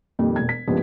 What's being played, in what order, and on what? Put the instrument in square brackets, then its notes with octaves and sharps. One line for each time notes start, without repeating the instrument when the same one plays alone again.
[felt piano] F2 A#2 D#3 G3
E1 G#6
B6
C#2 G2 F3 G3 A#3 B3